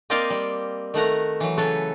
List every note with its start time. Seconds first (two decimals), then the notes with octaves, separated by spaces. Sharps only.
0.10 A#3 C4 D5 D#5 F5 G5
0.30 G3
0.94 D#3 A3 F#5 A#5
1.40 E3 F#3
1.58 C#3 A4 B4 C#5